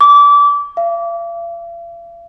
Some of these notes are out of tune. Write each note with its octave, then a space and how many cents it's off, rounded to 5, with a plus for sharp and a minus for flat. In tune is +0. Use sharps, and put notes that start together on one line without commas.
D6 -25
F5 -45